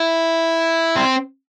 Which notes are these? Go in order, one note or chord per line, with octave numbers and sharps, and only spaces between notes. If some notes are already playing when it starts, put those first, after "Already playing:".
Already playing: E4
C4